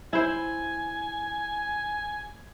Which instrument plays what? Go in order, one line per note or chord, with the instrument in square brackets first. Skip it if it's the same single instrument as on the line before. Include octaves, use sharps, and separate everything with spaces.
[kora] E4 C5 [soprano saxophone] G#5